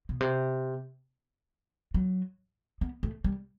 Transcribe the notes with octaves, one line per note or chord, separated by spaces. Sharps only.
B2
C3
F#3
B3
A3
G3